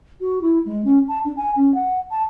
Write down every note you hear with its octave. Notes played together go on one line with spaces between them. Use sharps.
F#4
E4
G#3
C#4
A5
D4
G#5
C#4
F#5
A5